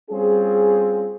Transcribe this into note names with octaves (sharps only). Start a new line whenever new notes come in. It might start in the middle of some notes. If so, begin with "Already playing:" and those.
G3 C4 C#4 F4 G#4